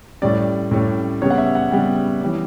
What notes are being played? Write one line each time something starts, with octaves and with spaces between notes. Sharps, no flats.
A2 G3 C#4 D5
A2 G3 C#4
C#3 G3 B3 C#5
F#5
E5
F#5
C#3 G3 B3 G5
E3 G3 C#4